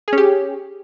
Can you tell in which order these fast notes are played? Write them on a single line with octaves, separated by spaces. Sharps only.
G#4 C#4 G4